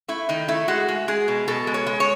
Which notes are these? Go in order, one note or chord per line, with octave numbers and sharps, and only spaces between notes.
A3 E4
D#3 D#4
A3 E4
G#3 F#4
G#3
G#3 G#4
B2
B2 A4
G#3
C#5
G#3
C#5